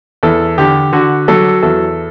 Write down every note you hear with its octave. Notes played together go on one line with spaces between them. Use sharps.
E2 A4
D3 G4
D3 F#4
F#3 A4
E2 A4